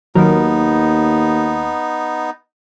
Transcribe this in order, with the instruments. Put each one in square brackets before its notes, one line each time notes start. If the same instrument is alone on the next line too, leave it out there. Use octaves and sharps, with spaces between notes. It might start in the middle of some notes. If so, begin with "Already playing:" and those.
[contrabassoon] D#2 [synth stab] D#3 F#3 A#4 [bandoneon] B3 D#4